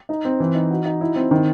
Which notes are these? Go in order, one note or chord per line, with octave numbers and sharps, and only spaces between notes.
D#4
C4
E3
D#4
F#4
D#4
E4
C4
D#3